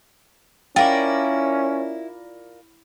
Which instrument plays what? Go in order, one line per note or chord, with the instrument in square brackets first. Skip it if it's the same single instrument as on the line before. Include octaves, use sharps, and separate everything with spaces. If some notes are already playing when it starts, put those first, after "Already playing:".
[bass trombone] C#4 [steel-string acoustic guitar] E4 [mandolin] F4 A#4 D5 [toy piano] G5